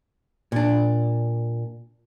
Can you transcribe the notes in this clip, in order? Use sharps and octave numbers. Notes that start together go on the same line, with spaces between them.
A#2 D4